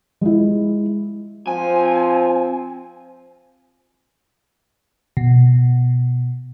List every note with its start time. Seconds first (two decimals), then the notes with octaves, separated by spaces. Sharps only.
0.21 G#3 E4
1.47 F3 C4 G#5
5.17 B2